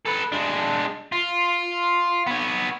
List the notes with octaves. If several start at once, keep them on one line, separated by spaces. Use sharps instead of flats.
A4 B4
G#3 D4
F4
B3 C#5